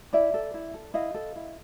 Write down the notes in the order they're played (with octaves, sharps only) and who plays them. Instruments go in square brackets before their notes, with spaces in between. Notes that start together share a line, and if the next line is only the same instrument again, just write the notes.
[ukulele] E4 D5 E5
A4
E4
A4
E4 D#5 F5
A4
E4